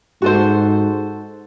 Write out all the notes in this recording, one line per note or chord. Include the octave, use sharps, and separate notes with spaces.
G#2 F#4 A4 C5